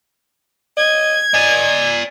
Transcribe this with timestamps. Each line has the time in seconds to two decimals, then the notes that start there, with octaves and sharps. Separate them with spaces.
0.77 D#5 G#6
1.34 D5 D#5 G#5